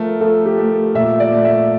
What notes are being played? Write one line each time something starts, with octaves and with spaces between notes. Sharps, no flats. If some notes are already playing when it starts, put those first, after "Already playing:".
Already playing: F3 A3 A#4
F3 A4
G4
A3
A#2 E5
D5
A3
E5